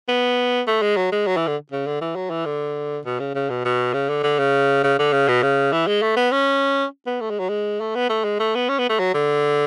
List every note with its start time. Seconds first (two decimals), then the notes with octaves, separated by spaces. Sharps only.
0.08 B3
0.67 A3
0.82 G#3
0.97 F#3
1.12 G#3
1.27 F#3
1.37 E3
1.47 D3
1.72 C#3
1.87 D3
2.01 E3
2.16 F#3
2.30 E3
2.46 D3
3.05 B2
3.20 C#3
3.35 C#3
3.50 B2
3.65 B2
3.94 C#3
4.09 D3
4.24 D3
4.39 C#3
4.84 C#3
4.99 D3
5.13 C#3
5.28 B2
5.43 C#3
5.72 E3
5.87 G#3
6.02 A3
6.17 B3
6.32 C#4
7.06 B3
7.21 A3
7.30 G#3
7.39 F#3
7.49 G#3
7.80 A3
7.95 B3
8.10 A3
8.24 G#3
8.40 A3
8.55 B3
8.69 C#4
8.79 B3
8.89 A3
8.99 F#3
9.14 D3